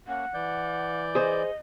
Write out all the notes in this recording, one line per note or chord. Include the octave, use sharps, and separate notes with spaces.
A#3 C#4 F#5
E3 D5 G6
G#4 C5 D#5